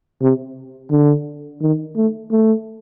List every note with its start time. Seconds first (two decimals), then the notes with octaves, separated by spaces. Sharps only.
0.22 C3
0.91 D3
1.61 D#3
1.96 A3
2.31 A3